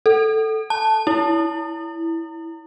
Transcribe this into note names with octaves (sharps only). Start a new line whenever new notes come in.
A4
A5
E4